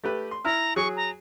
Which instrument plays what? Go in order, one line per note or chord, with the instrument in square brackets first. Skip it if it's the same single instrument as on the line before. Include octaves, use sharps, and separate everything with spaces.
[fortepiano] A3 G4 B4
C6
[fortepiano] E4 F6 [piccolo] A#5
[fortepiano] F#3 G#4 [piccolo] C#6
[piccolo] A#5